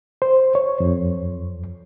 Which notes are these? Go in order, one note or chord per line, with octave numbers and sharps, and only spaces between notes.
C5
C#5
F2